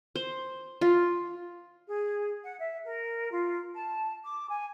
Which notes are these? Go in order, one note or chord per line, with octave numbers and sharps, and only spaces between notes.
C5
F4
G#4
F#5
E5
A#4
F4
A5
D6
G#5